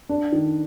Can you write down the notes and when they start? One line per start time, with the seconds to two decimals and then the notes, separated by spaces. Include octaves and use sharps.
0.09 D4
0.32 D#3